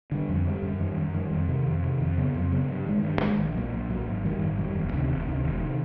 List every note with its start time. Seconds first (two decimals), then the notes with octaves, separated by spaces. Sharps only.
0.12 D3 G3
0.29 F2
0.45 D3 G3
0.62 F#2
0.80 D#3 G3
0.97 F#2
1.14 D#3 G3
1.31 F2
1.49 C3 D#3
1.66 F2
1.83 C3 D#3
2.00 F2
2.18 C#3 F#3 B3
2.34 F2
2.52 C#3 F#3 B3
2.68 G2
2.86 D#3 G#3
3.03 G2
3.21 D#3 G#3
3.38 A#1
3.55 A#2 F#3
3.73 A#1
3.89 A#2 F#3
4.06 G#1
4.24 F#2 D#3 G3
4.40 G#1
4.58 F#2 D#3 G3
4.75 E1
4.92 D2 C3 D#3
5.09 E1
5.26 D2 C3 D#3
5.44 E1
5.61 C3 D#3